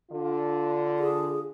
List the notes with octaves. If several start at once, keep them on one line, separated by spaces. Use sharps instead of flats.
D3 F4
G#4